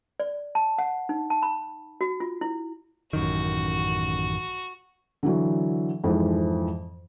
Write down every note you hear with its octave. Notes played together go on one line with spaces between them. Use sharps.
D5
A5
F#5
D#4
A5
B5
F#4
F4
E4
A1 F#2 D#3 F#4
D3 E3 F#3
F2 G#2 E3 F3